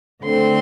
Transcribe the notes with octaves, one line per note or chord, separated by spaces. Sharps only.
D3 A3 C4 C6